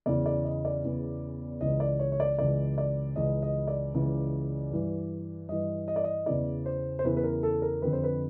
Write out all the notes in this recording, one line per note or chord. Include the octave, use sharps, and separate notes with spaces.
E2 C#3 E3 D5
D5
D#5
D5
E2 C#3 E3
C#2 C#3 E3 D#5
D5
C#5
C#5
D5
C#2 C#3 E3 D5
D5
C#2 C#3 E3 D#5
D#5
D5
C#2 C#3 E3
G2 E3
G2 E3 D#5
D#5
D5
D#5
E2 C#3 E3 D5
C5
C5
E2 C#3 E3 B4
B4
A#4
A4
A#4
F2 D3 B4
C5
B4